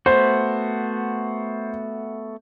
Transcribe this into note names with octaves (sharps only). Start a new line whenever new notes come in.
A3 B3 F#4 C5